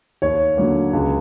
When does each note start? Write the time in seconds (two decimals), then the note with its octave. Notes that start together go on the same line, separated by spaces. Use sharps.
0.22 D#2 C#5
0.57 D3 F#3 A#3
0.93 C#2